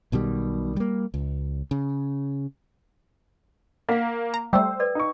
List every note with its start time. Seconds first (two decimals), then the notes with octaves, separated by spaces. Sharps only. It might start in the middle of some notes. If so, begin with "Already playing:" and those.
0.12 B1 B2 D#3 G3
0.77 G3 A#3
1.14 C#2
1.71 C#3
3.89 A#3 F5 F#5
4.34 A#5
4.53 G3 A3 C5 G5 E6
4.80 A4 B4 D5
4.95 D#4 C#6